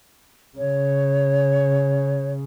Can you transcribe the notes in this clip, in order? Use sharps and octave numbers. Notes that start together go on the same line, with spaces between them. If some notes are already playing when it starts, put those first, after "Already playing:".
C#3 C#5